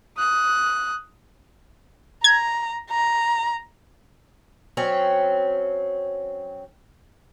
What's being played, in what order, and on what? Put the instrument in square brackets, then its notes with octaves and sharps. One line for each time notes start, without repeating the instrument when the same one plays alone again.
[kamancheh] D#6 F#6
[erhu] A#5 [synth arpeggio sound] G#6
[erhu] A#5
[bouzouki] F#3 C4 C#4